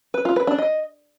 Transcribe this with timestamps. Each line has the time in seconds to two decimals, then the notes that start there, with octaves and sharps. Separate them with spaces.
0.14 B4
0.25 F4
0.36 B4
0.47 D4
0.58 D#5